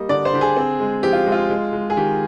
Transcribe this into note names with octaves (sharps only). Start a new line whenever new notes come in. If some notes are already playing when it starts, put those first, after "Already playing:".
Already playing: G3 A#3 D#5
D3 D5
C5
D3 G4
G#4
C4
G#3
F3 G4
F4
G#3
F4
G#3
G#3
G#4
D#3 G4